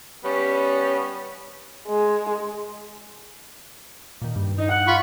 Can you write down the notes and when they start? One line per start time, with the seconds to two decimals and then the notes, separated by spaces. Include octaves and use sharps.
0.24 G3 B3 C#4
1.88 G#3
4.22 A#2 D#3
4.36 G2
4.57 D#4
4.69 F#5
4.87 F4 B5 C#6